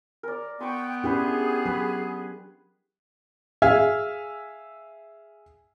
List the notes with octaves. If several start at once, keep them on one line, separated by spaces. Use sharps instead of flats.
A#4 D5
B3 G5 C6 C#6
C#4 D4 E4 G4 G#4 B4
F#3 B4
G#4 E5 F5 G#5 F6